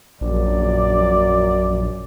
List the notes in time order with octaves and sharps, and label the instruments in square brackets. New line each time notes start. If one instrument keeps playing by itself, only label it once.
[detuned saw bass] A#1 [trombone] F#2 [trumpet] D5